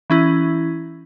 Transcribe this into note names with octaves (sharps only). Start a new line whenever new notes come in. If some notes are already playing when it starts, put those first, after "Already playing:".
E3 C#4 E4